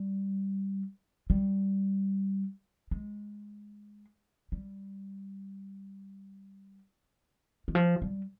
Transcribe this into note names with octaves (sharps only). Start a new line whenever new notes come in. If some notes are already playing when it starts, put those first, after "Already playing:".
Already playing: G3
G3
G#3
G3
D#3
F3
G3